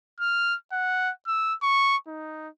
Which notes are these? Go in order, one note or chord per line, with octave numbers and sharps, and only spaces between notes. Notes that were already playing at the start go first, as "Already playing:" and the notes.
F6
F#5
E6
C#6
D#4